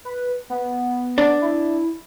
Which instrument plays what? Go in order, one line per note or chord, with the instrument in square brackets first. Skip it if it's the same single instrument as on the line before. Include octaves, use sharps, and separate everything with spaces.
[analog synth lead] B4
B3
[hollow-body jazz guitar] D4
[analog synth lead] E4